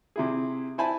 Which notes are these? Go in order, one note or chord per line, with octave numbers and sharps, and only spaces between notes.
C3 E4 G#4
E4 C5 G#5 A5 B5